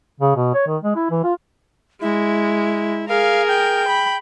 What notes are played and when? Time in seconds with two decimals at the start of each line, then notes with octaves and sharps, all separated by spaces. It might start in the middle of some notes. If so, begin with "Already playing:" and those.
0.20 C#3
0.36 B2
0.54 C#5
0.67 D#3
0.83 G#3
0.96 E4
1.11 E3
1.24 F4
2.01 G#3 E4
3.08 G#4 A#4 F5
3.48 G5
3.88 B5